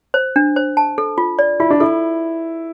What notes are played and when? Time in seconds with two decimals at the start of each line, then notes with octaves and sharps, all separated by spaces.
0.14 C5
0.36 D4
0.56 C5
0.77 A5
0.98 A4
1.18 F4
1.39 D5
1.60 E4 F4
1.70 D4
1.80 E4 A4